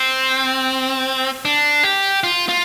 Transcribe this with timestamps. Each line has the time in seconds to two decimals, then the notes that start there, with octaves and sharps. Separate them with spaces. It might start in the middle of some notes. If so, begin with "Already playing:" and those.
Already playing: C4
1.45 D4
1.83 G4
2.24 F4
2.49 F4